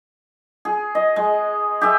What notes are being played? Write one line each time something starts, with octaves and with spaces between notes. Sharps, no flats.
G#4
D#5
G#3
G4 G#4 E5